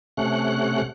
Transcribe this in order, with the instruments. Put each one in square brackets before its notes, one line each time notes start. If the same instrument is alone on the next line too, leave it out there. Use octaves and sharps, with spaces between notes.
[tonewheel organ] C3 A3 C#4 F#5 F#6